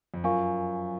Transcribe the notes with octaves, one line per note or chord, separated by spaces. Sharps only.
F2
F#2 F4 A#4 F5 G#5 C#6